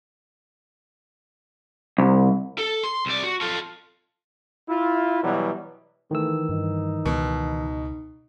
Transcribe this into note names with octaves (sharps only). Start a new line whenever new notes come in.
C2
A4
C6
C2 D5
F#4
F4 A4
E4 F4
B2 E3 F#3 G3
D#3 E3 A3 E6
G2 D#4
C#2 B2